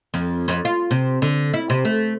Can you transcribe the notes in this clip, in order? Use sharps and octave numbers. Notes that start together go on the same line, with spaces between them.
F2
F2
F4
C3
D3
E4
C3
A3